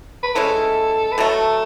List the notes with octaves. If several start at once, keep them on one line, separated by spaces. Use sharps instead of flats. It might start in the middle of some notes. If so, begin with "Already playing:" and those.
B4
E3 G#3 C#4 E4 A4
B4
B2 F#3 A3 A4